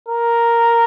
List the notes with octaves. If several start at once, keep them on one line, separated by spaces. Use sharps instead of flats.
A#4